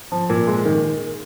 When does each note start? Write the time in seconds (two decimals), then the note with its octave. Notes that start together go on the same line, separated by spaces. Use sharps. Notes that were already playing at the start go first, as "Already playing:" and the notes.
0.12 F3
0.30 A#2
0.47 G#3
0.65 D#3